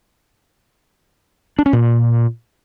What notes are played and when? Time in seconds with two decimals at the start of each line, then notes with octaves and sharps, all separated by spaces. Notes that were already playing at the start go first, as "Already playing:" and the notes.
1.59 D4
1.66 C#4
1.73 A#2